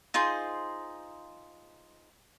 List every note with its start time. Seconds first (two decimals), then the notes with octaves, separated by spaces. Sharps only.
0.14 D#4 F4 G#4 C5